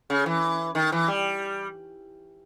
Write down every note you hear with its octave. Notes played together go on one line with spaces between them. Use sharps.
C#3
E3
D#3
E3
G3